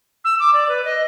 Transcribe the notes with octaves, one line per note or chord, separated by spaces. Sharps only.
E6
D6
D5
B4
D#5